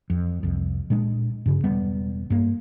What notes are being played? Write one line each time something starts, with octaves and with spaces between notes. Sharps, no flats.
F2
C2 F2
A#2 G#3 D4
G2 C#3
E1 G3 B3
G2 A#3